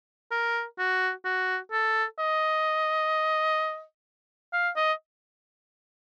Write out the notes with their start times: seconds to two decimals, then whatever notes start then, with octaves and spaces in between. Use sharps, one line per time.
0.31 A#4
0.78 F#4
1.25 F#4
1.72 A4
2.19 D#5
4.53 F5
4.76 D#5